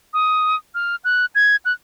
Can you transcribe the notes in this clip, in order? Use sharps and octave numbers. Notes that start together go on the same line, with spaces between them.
D#6
F6
F#6
G#6
F#6